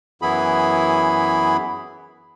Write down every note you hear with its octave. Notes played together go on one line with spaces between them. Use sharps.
F#2 E3 B3 E4 G#4 B5